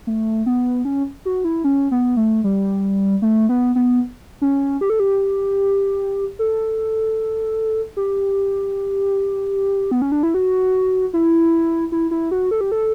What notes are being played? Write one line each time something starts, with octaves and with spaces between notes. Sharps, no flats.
A3
B3
C#4
F#4
E4
C#4
B3
A3
G3
A3
B3
B3
C#4
G4
A4
G4
A4
G4
B3
C#4
D4
E4
F#4
E4
E4
E4
F#4
A4
G4
A4